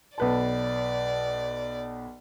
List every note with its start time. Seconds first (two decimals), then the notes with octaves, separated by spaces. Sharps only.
0.18 B1 B4 D5 A5